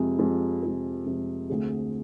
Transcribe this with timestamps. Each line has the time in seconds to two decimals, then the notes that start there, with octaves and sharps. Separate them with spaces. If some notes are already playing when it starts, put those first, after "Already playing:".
Already playing: F2 C3 G#3
0.19 F2 C3 G#3
0.63 F2 C3 G#3
1.06 F2 C3 G#3
1.50 D2 D3 A3 C4 G#4